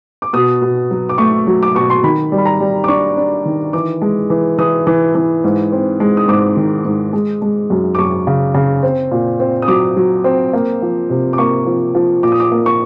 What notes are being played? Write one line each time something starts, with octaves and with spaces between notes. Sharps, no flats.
D6
B2 D#6
B2
F#3
D6
A3 C#6
F#3
D6
B2 C#6
C6
D#3 B5
G3
B5
A#5
G3
D6
D4 C#6
D4
D#3
E3 D6
G#3
E3
E3 D#6
E3
E3
G#2
C4
G#3
D#6
G#2 D6
D#3
G#2
G#3
G#3
F#2
D6
F#2 C#6
C#3
C#3
C4
A#2
C4
D#6
F#3 D6
F#3
C4
A#3
F3
C3
D6
A#3 C#6
F3
F3
A#2 D6
D#6
D6
A#3
C#6